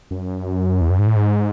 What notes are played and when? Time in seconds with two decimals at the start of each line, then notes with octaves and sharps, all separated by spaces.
0.11 F#2
0.81 E2
0.90 F#2
0.99 G#2
1.07 A2
1.16 G#2